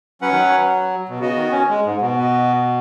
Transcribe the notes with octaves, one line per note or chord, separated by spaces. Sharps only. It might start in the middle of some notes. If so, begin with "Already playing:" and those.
F#3 C#4 B4 F#5
D#3
F#3
B2
C#3 B3 F#4 D#5
D#3
C#4
G#3
G#2
B2
B3 F#4 B4 D#5